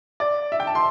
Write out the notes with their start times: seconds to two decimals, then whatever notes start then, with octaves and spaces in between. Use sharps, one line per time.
0.20 D5
0.52 E5
0.60 G5
0.67 A5
0.75 C6